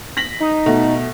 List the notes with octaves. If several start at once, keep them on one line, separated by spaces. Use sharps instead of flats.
A#6 B6 F#7
D#4
B2 A3